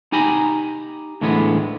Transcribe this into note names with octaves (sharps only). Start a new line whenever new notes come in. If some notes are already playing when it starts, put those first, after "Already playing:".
D#4 G4 G#5 A#5 B5
D2 A2 D3 E3 G#3 B3